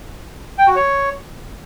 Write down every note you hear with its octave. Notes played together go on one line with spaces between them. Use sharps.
G5
F#4
C#5